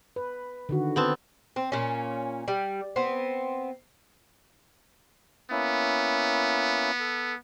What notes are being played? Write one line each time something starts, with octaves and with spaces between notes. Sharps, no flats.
B4
D3 D#3 F#4
B3 C4 A5
C4
A#2 C#4
G3
B3 C4
A#3 B3 C#4 E4
A4